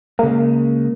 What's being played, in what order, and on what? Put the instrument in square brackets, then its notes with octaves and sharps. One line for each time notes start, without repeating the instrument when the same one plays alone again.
[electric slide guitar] C#3 G#3 [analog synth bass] A#3